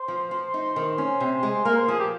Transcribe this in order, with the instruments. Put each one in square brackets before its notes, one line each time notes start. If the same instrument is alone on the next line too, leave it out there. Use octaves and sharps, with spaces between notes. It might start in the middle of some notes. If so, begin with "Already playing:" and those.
Already playing: [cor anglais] C5
[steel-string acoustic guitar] F3
F3
D#4
[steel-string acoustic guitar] D#3 [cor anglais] C5
[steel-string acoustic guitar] C#4
C3
G#3
[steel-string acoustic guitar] A#3 [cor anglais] A#4
[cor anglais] C5
[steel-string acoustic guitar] F3 [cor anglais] G#4
[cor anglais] G4